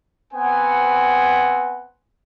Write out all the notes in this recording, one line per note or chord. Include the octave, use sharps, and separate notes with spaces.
B3 C4 B4 C5 F#5 G#5